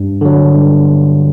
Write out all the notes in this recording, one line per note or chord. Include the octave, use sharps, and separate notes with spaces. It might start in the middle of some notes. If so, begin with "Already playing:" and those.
Already playing: G2
D3 F#3
G2